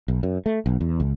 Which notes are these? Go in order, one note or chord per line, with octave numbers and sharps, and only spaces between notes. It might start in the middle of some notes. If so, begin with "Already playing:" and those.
B1
F#2
A3
B1
E2
C#2